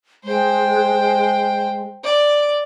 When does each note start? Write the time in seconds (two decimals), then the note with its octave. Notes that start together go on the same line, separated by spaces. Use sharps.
0.24 G#3 C5 G5
2.04 D5